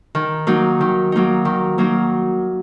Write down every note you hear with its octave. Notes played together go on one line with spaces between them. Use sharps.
D#3
F#3 A#3 D#4
D#3
F#3 A#3 D#4
D#3
F#3 A#3 D#4